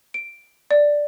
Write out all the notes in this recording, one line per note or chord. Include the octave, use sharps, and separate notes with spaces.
D7
D5